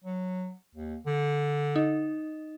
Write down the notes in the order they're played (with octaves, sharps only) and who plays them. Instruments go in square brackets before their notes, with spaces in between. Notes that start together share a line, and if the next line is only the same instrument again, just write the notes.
[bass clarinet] F#3
D#2
D3
[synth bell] D#4